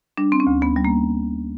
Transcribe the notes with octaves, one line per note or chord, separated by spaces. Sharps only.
G3 D4
C4
C#4
D2
B3
G3
A#3